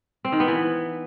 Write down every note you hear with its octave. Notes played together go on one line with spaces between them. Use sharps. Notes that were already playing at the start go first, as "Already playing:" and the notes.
C4
D#3
B3
E3